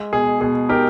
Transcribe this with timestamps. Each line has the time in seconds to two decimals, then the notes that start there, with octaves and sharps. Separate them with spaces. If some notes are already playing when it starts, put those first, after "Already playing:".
Already playing: G#3
0.13 B2 G#4
0.41 B2 G#4
0.69 D#4 G4 A#4